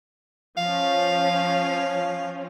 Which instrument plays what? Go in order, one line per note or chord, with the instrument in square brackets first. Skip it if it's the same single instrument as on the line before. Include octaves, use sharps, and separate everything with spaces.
[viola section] F3 C#4 [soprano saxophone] F5